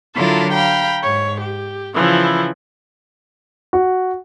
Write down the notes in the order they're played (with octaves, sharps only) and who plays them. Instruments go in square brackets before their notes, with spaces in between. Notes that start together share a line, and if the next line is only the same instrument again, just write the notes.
[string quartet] D3 F#3 E4 F4 A4 A#4
F5 G5 A#5 B5
G#2 C#5
G4
C#3 E3 F3 E4
[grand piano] F#4